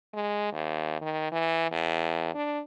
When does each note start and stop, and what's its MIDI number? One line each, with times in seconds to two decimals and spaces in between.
0.14 0.51 56
0.53 0.98 39
1.01 1.29 51
1.31 1.69 52
1.72 2.30 40
2.35 2.60 62